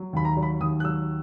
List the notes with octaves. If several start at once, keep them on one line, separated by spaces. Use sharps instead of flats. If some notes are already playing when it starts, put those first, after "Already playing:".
Already playing: F#3
D#2 B5
A#5
F#3
B5
D#2 D#6
F#6
F#3 E6